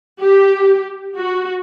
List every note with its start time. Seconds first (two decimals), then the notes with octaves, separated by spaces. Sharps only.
0.20 G4
1.15 F#4